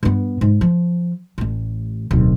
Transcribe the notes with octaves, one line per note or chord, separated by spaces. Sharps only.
G2 B3
G#2
F3
A1 A3
D1 B1